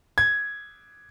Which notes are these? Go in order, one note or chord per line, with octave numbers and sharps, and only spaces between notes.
G#6